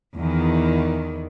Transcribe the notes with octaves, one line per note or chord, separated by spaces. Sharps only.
E2 D#3